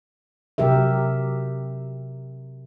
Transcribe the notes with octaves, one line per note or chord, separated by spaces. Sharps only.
C3 F#3 G4 A#4 E5